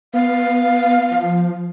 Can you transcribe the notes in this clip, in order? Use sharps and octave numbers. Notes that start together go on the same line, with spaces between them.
B3 F5
F3